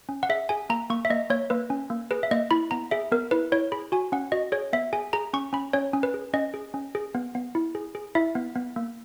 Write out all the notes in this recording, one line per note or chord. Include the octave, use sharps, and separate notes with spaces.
C#4
F#5
G#4 E5
G#4 G#5
A#3 A#5
A#3 C#6
E5
A#3 D#5
A#3 C#5
A#3 B4
C#4
A#3
G#4 B4
E5
A#3 D#5
E4 B5
B3 A#5
G#4 E5
B3 A#4
E4 B4
E4 C#5
G#4 B5
F#4 G#5
C#4 F#5
F#4 D#5
G#4 C#5
B3 E5
G#4 G#5
G#4 A#5
C#4 C#6
C#4 B5
C#4 C#5
C#4
B4
G#4
C#4 D#5
G#4
C#4
G#4
B3
B3
E4
G#4
G#4
E4 E5
B3
B3
A#3